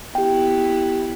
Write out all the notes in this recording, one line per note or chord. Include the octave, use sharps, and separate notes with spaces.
B3 E4 G4 G5